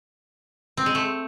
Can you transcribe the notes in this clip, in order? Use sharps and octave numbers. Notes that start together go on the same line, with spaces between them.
C4
G#3
A3